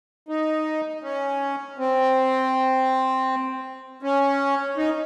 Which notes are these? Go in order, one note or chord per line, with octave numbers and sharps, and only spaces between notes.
D#4
C#4
C4
C#4
D#4